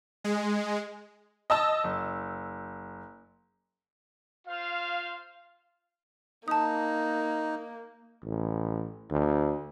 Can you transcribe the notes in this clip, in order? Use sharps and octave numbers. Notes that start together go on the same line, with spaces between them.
G#3
D#5 A5 E6
F#1
F4 C5 F5
A#3 D#4 A5 D#6
A1
D2